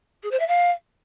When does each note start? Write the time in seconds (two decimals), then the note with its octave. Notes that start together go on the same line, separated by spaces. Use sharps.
0.23 G#4
0.31 C5
0.39 E5
0.47 F5